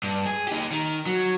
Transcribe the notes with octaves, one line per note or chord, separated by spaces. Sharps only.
G2
G#4
D#4 G4
D#3
F#3